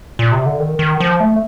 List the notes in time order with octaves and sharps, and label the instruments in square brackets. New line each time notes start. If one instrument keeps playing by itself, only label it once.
[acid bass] A#2
C3
D3
D#3
D#3
F3
A3